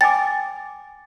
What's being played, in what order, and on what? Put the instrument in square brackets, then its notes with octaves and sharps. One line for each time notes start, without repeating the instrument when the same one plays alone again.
[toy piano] G5 G#5 D6 [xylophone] A6